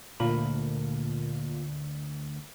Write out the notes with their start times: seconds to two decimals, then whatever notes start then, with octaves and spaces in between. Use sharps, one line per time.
0.20 D2 A#2 A#3 A#4 B5